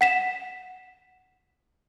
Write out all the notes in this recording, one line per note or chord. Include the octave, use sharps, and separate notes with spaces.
F#5 B6 E7